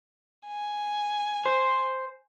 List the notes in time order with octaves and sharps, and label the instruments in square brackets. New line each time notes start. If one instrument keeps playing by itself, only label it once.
[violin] G#5
[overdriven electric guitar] C5